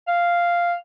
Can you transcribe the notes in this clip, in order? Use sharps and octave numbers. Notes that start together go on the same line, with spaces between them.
F5